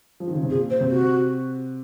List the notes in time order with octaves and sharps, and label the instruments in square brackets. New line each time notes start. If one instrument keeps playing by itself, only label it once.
[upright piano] F3
D#3
C#3
C3
[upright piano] A#2 [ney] G#4
[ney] C5
[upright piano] C3
[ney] F#4